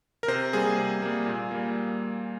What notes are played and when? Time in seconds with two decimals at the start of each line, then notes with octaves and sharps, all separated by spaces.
0.23 A#4
0.28 C3 C5
0.53 G3 A#3 G#4
0.78 C3
1.02 G3 A#3
1.26 A#2
1.51 G3 A#3